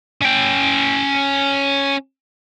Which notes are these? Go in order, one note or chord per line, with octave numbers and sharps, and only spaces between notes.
C#4 G5